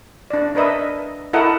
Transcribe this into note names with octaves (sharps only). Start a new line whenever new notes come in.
D4 D5
D4 A#4 B4 D#5 E5
E4 A4 A#4 D#5 F#5